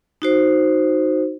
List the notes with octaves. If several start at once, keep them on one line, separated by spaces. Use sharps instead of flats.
D#4 F#4 C5